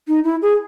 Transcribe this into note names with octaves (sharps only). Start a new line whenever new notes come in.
D#4
E4
G#4